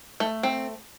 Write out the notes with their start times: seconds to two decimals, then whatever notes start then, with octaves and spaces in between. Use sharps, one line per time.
0.20 A3
0.43 C4